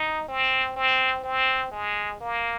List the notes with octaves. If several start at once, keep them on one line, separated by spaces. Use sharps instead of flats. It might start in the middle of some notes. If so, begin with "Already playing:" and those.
Already playing: D#4
C4
C4
C4
G#3
A#3